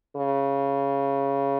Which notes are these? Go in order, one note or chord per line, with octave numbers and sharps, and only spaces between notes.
C#3